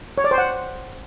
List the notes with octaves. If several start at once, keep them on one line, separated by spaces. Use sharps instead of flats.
C#5
D5
C5
F#5